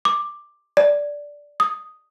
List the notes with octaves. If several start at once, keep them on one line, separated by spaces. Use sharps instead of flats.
D6
D5
D#6